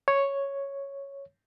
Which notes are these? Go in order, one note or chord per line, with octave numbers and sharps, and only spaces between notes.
C#5